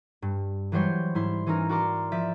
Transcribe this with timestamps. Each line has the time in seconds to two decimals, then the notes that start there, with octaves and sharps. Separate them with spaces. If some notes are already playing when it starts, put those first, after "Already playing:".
0.22 G2
0.72 E3 F#3 G3 C5 C#5
1.15 G#2 E4 C6
1.46 E3 C#4 D#4 A#4
1.69 F#4 A#4 D5 A#5 C6 D6
2.12 F3 D5 E5